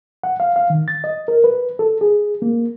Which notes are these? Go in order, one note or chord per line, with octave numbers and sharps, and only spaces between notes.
F#5
F5
F5
D#3
A6
D#5
A#4
B4
A4
G#4
A#3